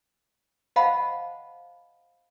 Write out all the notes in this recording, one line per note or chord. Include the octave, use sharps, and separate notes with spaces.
C5 D#5 F5 F#5 A5 B5